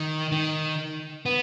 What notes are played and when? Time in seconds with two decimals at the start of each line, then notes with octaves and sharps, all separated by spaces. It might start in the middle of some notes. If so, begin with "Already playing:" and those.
Already playing: D#3
0.32 D#3
1.26 B3